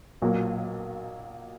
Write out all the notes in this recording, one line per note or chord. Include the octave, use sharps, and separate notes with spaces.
B1 A#2 F#3 A#3